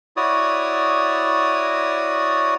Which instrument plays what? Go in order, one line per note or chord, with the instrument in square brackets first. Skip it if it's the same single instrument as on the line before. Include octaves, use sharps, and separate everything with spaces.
[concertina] E4 F#4 C#5 D5 D#6